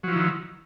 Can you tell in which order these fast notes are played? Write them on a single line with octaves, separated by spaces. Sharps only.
F#3 F3 E4 D#3